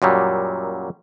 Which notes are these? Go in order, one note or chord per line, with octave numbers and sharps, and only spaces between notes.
F#2 A#2 F#3 G3